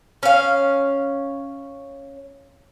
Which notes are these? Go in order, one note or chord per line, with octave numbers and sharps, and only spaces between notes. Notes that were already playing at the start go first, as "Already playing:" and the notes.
C#4 F5